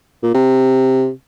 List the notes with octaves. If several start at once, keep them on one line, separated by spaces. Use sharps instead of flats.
A#2
C3